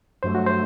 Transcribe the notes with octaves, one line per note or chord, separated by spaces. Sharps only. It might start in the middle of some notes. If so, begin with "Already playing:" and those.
G2 F#3 A3 C5
F#4
C5